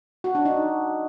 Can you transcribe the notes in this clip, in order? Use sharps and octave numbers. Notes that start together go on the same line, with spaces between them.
F#4
D4
D#4